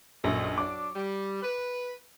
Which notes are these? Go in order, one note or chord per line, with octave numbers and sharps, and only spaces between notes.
A#1 F#2 A4 C#5 D#5
F#3 D4 D6
G3
B4